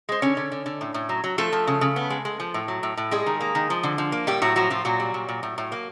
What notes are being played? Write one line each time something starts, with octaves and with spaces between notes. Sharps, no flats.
G#3 C5
D3 C#4 C#5
D3
D3
D3
A2
A2
F#3
F#3
F3 A3 A4
F3
C#3
C#3
B3
G#3
G#3
F3
A2
F#3
A2
A2
G3 G#3 G#4
D#3
A#3
D#3
F3
D3
F3
A#3
A2 G3 G4
A2 F#3 F#4
F3 F#3 F#4
A2 F3 F4
A#2 F#3 F#4
G3
A#2
A#2
A2
A2
A#3